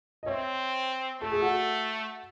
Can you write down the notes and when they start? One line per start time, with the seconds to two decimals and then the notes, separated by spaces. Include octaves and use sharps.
0.23 D#5
0.26 C4 C#5 E5
1.21 A3 A4
1.32 G#4
1.41 F#4 A4